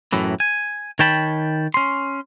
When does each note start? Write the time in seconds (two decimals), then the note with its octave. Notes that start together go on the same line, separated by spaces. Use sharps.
0.13 F#2 A2 E3
0.40 G#5
0.99 D#3 C#5 G5 A5 B5
1.74 C#4 C6